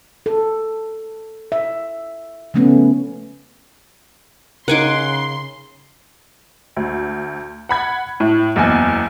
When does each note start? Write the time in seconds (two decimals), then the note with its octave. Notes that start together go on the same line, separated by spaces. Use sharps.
0.26 A4
1.52 E5
2.54 C#3 F3 A3 B3 C#4
4.68 C#3 D#4 A#4 F#5 G#5 C6 D6
6.76 D2
7.69 F#5 B5 G#6
8.20 A2
8.56 F#1 E2 G#5